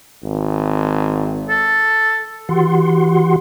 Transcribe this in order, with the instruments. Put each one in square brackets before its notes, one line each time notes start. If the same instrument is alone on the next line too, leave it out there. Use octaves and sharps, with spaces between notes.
[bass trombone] G#1
[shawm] A4
[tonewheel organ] E3 F#4 G4 F#5 C6